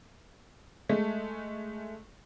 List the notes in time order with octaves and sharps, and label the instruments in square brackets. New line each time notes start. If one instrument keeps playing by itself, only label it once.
[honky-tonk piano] G#3 A3